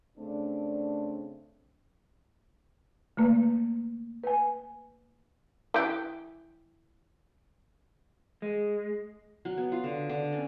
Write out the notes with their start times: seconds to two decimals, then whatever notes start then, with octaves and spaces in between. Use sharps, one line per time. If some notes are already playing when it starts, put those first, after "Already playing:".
0.18 C#3 A3 C4 D4
3.17 D3 A3 A#3 B4
4.24 B4 G#5
5.74 E3 G4
8.42 G#3
9.45 F#3
9.57 B3
9.72 F4
9.84 D3
10.09 D3
10.32 C#4